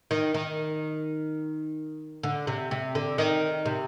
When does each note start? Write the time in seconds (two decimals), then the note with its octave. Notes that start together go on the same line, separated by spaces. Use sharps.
0.11 D#3
0.34 D#3
2.23 D3
2.47 C3
2.71 C3
2.95 D3
3.18 D#3
3.66 C3